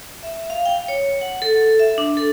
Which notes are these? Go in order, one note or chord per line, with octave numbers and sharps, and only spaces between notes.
E5
F5
G5
C#5
F#5
A4
E5
D4
A4